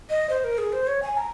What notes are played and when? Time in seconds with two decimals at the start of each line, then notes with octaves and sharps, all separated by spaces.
0.09 D#5
0.29 C5
0.44 A#4
0.58 G#4
0.72 C5
0.87 C#5
1.03 G#5
1.17 A#5